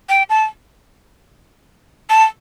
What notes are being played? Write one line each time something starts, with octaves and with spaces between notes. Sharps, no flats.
G5
A5
A5